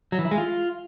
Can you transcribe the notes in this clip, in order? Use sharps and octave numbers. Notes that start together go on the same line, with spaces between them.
F#3
E3
E4
G#3
F4